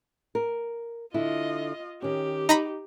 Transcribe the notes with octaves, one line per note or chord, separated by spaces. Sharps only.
A#4
D3 E4 F4 D#5
D#3 C#4 G4
D#4 A#5 B5